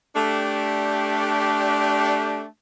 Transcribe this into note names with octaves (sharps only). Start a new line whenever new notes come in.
A3 D4 G4